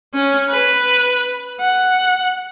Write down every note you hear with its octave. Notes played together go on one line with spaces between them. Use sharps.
C#4
B4
F#5